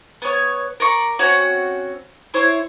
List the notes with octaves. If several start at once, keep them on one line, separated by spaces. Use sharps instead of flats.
B3 C#5
A#4 D5 C#6
C4 C#4 F#4
E4 C5 C#5